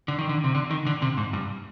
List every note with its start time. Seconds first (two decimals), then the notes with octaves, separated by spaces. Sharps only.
0.08 D3
0.19 D#3
0.29 D3
0.44 C3
0.55 D3
0.71 D#3
0.87 D3
1.02 C3
1.17 G#2
1.33 G2